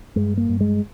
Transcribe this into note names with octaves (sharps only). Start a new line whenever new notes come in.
G2 G#3
A#3
G2
G#3